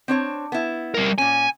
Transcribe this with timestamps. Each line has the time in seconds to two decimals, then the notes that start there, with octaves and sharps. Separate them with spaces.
0.08 C4 D4 C#5
0.52 B3 E4
0.94 G3 A#4
1.18 A#2 C#4 G#5